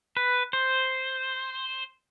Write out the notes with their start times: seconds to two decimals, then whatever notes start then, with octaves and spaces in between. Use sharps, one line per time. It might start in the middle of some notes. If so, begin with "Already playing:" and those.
0.17 B4
0.53 C5